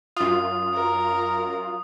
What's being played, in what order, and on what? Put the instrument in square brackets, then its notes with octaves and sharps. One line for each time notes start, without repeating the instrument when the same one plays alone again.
[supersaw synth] F#2 F4 [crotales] D#6
[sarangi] A#4